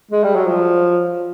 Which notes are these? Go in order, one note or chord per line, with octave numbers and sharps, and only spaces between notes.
G#3
G3
F#3
F3